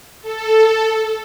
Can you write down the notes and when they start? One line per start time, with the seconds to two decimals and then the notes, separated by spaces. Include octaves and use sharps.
0.21 A4